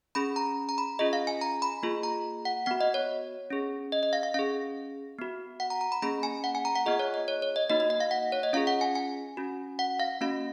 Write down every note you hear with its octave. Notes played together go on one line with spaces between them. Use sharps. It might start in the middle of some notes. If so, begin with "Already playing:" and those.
C#4 G#4 B5
A#5
A#5
B5
C#4 F4 G#4 D#5
F5
G#5
A#5
B5
A#3 F4 G#4
A#5
F#5
B3 F#4 F#5
D#5
C#5
C#4 G#4
D#5
D#5
F5
F5
C#4 G#4 F5
B3 F#4
F#5
A#5
A#5
B5
A#3 C#4 G#4 B5
G#5
F#5
G#5
A#5
F#5
B3 F4 G#4 D#5
C#5
D#5
C#5
C#5
D#5
A#3 D#4 F#4 D#5
D#5
D#5
F5
F#5
C#5
D#5
C#4 F4 G#4 F5
F#5
G#5
G#5
C#4 F#4
F#5
F5
A#3 C#4 F#4 F5